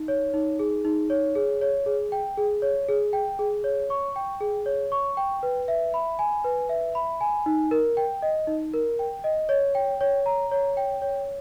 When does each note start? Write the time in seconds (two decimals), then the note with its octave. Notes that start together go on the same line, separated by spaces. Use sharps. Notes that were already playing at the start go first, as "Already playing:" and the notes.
Already playing: D#4
0.08 C#5
0.34 D#4
0.59 G#4
0.85 D#4
1.10 C#5
1.35 G#4
1.61 C#5
1.86 G#4
2.12 G5
2.37 G#4
2.62 C#5
2.89 G#4
3.13 G5
3.39 G#4
3.64 C#5
3.90 C#6
4.16 G5
4.41 G#4
4.66 C#5
4.92 C#6
5.17 G5
5.43 B4
5.68 E5
5.94 B5
6.19 G#5
6.44 B4
6.69 E5
6.95 B5
7.21 G#5
7.46 D#4
7.71 A#4
7.97 G5
8.22 D#5
8.47 D#4
8.74 A#4
8.99 G5
9.24 D#5
9.49 C#5
9.75 G5
10.01 C#5
10.26 A#5
10.51 C#5
10.77 G5
11.02 C#5